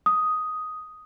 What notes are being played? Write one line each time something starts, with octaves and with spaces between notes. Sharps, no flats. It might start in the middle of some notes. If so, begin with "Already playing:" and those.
D#6